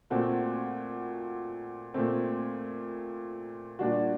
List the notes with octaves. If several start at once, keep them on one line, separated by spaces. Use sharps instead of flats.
A#2 A3 C4 F#4
A#2 A3 C4
A#2 G3 D4 F#4